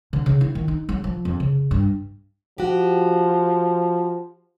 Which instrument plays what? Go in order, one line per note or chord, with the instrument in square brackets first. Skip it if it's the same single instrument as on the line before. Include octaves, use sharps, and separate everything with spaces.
[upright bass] D3
C#3
E4
D#3
D#4
F#3
F3
F2
C#3
G2
[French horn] F3 [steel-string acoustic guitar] F#4 G4